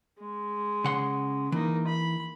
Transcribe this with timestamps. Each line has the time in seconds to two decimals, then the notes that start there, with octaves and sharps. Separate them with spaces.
0.19 G#3
0.84 C#3 F#5 C6
1.52 E3 A#3 D#4
1.87 B5